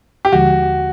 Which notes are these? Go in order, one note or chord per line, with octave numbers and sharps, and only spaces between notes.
G4
D#2 D3 F3 G#3 F#4